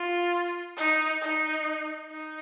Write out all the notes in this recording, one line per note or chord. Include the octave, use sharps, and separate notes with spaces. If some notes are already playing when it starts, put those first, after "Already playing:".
Already playing: F4
D#4
D#4
D#4